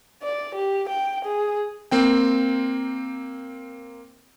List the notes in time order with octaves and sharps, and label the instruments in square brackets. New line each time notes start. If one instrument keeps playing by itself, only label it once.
[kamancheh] D5
G4
G5
G#4
[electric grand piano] A#3 C4 G5